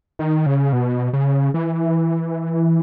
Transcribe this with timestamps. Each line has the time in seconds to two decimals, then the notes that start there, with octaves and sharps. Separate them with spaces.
0.19 D#3
0.46 C#3
0.73 B2
1.13 C#3
1.54 E3